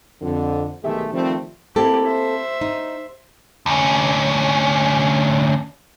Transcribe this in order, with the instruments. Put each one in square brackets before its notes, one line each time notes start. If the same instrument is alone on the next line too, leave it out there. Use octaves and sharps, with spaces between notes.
[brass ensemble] F2 D3
B1 D#3 G#3 A3 G4 E5
D#3 F3 G3 A3 C4
[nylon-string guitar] A#3 C4 A4 [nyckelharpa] E4 G4
[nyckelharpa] C5 E5
[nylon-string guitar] D#4
[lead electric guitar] D2 C#4